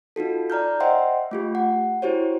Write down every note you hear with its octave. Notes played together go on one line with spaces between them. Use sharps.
D#4 F4 F#4 A4
D5 A#5 F6 G6
C5 D#5 E5 F#5 G5 C6
A3 F4 G4
F#5
E4 F#4 G4 C5 C#5